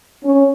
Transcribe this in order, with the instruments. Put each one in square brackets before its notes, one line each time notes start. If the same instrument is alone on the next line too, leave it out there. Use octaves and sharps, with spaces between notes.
[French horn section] C#4